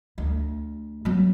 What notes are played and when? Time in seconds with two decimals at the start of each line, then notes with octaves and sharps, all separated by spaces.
0.18 D2
1.05 F#3 B3